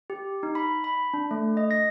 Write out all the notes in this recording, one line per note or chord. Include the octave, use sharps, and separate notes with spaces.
G4
D#4
B5
B5
D4
A3
D#5
A#6